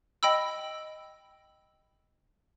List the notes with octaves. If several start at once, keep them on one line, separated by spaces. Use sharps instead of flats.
D#5 G5 B5 E6